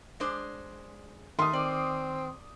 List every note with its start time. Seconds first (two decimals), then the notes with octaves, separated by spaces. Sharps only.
0.20 G#3 D4 C5
1.39 D#3 A3 C6 D#6 F6
1.53 C4 D5